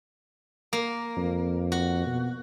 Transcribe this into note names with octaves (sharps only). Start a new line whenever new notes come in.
A#3
F2
F#4
B2